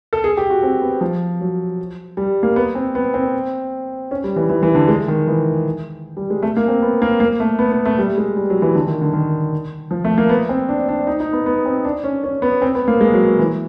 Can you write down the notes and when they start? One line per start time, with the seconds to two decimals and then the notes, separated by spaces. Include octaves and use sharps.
0.13 A4
0.24 G#4
0.37 G4
0.50 F#4
0.63 C4
0.82 B3
1.01 F3
1.41 F#3
2.17 G3
2.43 A#3
2.56 B3
2.75 C4
2.95 B3
3.14 C4
4.11 C#4
4.24 G3
4.36 E3
4.49 E3
4.63 E3
4.75 D3
4.88 G#3
5.08 D#3
5.27 E3
6.17 G3
6.30 G#3
6.42 A3
6.57 A#3
6.68 C4
6.82 B3
7.02 A#3
7.20 A#3
7.40 A3
7.59 B3
7.72 B3
7.85 A3
7.98 G3
8.18 G#3
8.37 G3
8.50 F#3
8.62 E3
8.75 D3
8.88 D#3
9.01 D3
9.13 D#3
9.91 F3
10.04 A3
10.18 A#3
10.29 B3
10.49 C4
10.69 D4
10.89 D4
11.07 D#4
11.20 D#4
11.33 B3
11.46 B3
11.66 C4
11.85 D4
12.04 C#4
12.24 C#4
12.42 B3
12.62 C4
12.75 B3
12.88 A#3
13.01 G#3
13.14 F#3
13.27 F#3
13.39 E3